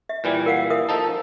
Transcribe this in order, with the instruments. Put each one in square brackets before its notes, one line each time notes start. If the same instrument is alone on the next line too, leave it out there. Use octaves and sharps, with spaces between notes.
[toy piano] E5
[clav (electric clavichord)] A#2 E3 G3
[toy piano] A#4 F5 F#5
A#4 E5 D#6
[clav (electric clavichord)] F3 D#4 A4